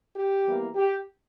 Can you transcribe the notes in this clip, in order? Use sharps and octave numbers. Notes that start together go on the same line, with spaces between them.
G4
E2 E3 G3 A#3
G4